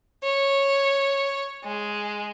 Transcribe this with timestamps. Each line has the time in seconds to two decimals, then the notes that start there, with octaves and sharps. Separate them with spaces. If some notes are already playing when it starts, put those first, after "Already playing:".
0.23 C#5
1.64 G#3